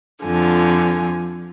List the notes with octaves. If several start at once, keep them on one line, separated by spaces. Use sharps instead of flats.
F2 D3 F3 G#5